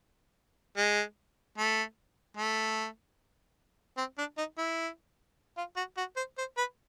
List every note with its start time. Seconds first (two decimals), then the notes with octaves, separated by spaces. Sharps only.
0.77 G#3
1.58 A3
2.37 A3
3.97 C4
4.18 D4
4.38 D#4
4.58 E4
5.57 F4
5.76 F#4
5.97 F#4
6.16 C5
6.38 C5
6.57 B4